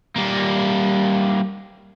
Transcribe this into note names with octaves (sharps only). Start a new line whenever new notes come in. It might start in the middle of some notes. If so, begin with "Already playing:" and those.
G3 A#3